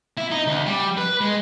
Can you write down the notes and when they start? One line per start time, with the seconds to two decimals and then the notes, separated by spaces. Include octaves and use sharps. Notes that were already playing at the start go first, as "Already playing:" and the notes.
0.17 E4
0.31 D#4
0.47 D2
0.66 G3
0.98 B4
1.21 G#3